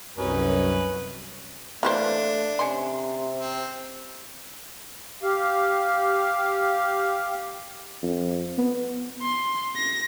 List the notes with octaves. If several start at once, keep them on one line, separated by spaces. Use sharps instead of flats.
C2 F#2 C#4 D#4 B4
E3 A3 A#3 D4 B4 C5
C3 C#4 C6
C4
G4 F5
F2
B3
C6
A#6